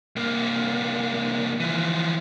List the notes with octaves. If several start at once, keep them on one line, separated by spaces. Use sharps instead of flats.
C2 A#3
E3 F3